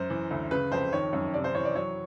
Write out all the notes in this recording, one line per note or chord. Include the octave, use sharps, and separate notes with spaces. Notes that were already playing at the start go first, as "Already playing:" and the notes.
Already playing: F#2 C5
E3
D2
C#3 B4
F2 C5
D#3 C#5
F#2
C3 D5
C5
E3 C#5
D5
F#3 C#5